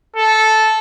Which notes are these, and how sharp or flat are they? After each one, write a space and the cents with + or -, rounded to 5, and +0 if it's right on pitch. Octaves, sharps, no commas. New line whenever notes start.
A4 -10